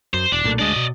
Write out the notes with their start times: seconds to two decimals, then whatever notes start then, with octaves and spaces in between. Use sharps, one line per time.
0.14 F#2 C5
0.32 E1 D4
0.44 B1 A#2 A3
0.59 D2 G#3 D4 D5 D#5
0.76 B2